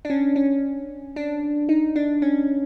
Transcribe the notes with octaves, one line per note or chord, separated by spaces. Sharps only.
D4
C#4
C#4
D4
D#4
D4
C#4